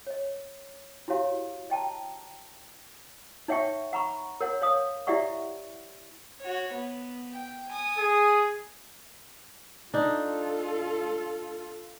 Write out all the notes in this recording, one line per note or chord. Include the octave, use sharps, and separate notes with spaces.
C#5 D#5
E4 F#4 G4 C#5 F5
D#5 G5 A5 A#5
D#4 C#5 E5 F#5 G5 C#6
F#5 A#5 B5 C#6
A#4 C#5 F#5
C#5 F5 D#6
E4 G4 D5 E5 F#5 C#6
F#4 C#5
B3
G5
G#5 D#6
G#4
D4 D#4 F4 A4